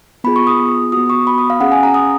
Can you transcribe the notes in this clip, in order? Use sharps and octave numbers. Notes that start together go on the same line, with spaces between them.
B3 F4 G#4 B5
C#6
D#6
B3 F#4 D#6
C#6
B5
D#6
F5
C#4 G#4 F#5
G#5
A#5
D#6